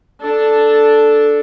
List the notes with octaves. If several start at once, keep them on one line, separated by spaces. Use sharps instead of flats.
D4 A4